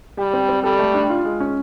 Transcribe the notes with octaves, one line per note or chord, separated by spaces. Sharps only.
G3 G4
C4
C4
G3 A4
A3
D4
F4
G#3
C#4